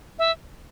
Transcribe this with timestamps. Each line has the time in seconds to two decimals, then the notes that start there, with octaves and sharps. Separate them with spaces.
0.19 E5